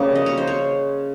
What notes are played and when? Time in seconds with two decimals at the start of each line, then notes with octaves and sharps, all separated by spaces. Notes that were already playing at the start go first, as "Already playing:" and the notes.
Already playing: C#3 G3 A#3 C#4
0.15 D#5
0.26 C#5
0.38 C5
0.47 C#5